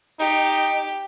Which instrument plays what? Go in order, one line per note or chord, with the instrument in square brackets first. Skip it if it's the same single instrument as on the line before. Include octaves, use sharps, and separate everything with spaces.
[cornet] D#4 [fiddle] G4